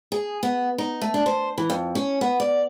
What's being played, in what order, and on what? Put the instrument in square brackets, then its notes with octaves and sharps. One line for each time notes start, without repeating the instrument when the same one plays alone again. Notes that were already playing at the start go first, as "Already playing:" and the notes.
[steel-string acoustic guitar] G#4
B3
D#4
A3
D4
C5
E3
F2
C#4
B3
D5